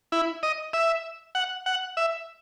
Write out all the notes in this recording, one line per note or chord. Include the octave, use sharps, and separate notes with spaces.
E4
D#5
E5
F#5
F#5
E5